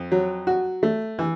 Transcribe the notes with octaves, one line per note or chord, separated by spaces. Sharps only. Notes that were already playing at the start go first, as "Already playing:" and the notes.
Already playing: F2
F#3
F#4
A3
E3